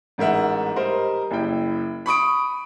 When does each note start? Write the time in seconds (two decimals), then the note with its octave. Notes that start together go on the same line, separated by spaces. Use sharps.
0.18 A1 G#2 A#4 E5 F#5
0.76 G3 A#4 C5 D#5
1.31 F#1 E4 G5
2.06 B5 C#6 D#6 D7